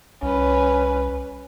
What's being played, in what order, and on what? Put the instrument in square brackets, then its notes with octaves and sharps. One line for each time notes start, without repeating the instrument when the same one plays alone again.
[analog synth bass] C2 [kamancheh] C#4 B4